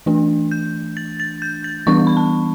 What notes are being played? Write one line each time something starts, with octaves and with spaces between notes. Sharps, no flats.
E3 A3 D4
G6
A6
A6
G6
A6
E3 G3 B3 D4 C#6
C#6
B5
A5